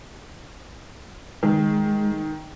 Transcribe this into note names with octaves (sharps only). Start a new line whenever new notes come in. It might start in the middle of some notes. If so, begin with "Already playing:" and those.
D#3 G#3